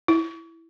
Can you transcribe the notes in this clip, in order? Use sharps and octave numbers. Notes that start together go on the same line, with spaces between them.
E4